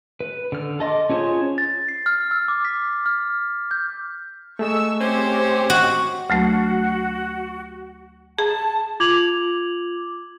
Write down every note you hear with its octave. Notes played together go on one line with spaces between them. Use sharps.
B4
D3 F6
A4 D#5 C6 D6
C#4 F4 G#4 C5 C#5
A6
C7
F6
E6
D6
B6
F6
G6
A3 G#4 D#5 C#6 E6
C4 C#4 G4 C5
F#4
D2 F#3 A3 F#4
G#4 A5
F4 D6 G#6 F7 F#7